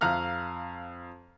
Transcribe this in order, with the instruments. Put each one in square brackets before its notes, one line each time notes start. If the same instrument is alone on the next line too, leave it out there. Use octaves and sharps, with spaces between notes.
[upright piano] F2 F5 A#5 F6 F#6